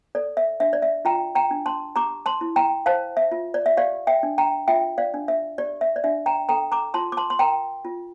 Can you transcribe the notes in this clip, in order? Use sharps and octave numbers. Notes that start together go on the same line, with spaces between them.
A4 D5
E5
D4 E5
D5
E5
F4 G5 A#5
G5 A#5
D4
A5 C6
G4 A#5 D6
A5 C6
E4
G5 A#5
C5 F5 A5
E5
F4
D5
E5
G4 D5 F5
E5 G5
D4
G5 A#5
F4 E5 G5
D5 F5
D4
E5
G4 D5
E5
D5
D4 E5
G5 A#5
A4 G5 A#5
A#5 D6
F4 A5 C6
D6
A5 C6
C6
A#4 G5 A#5
F4